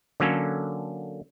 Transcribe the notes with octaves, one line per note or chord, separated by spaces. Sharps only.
D3 F#3 A#3 C#4 A4